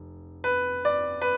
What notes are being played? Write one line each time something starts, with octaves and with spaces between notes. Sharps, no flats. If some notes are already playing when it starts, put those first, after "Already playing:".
Already playing: F1
B4
D5
B4